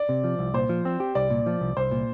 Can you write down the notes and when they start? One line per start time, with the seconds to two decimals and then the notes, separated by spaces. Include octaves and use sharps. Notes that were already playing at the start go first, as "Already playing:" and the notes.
Already playing: D5
0.09 C3
0.24 F3
0.39 C2
0.54 A#2 C5
0.69 F3
0.85 C4
1.00 G4
1.15 C2 D5
1.31 A#2
1.46 F3
1.61 C2
1.77 C2 C5
1.91 A#2